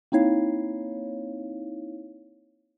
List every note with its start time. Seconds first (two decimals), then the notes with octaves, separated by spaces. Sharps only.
0.12 A#3 C4 D#4 E4 C#5 F5